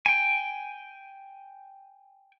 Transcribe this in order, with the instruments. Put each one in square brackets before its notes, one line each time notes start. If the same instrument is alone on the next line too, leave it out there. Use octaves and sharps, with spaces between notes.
[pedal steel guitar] G5 G#5